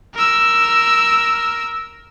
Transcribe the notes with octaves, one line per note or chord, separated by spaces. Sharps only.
A#4 E6